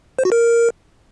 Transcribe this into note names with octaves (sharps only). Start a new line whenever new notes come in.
C5
F#4
A#4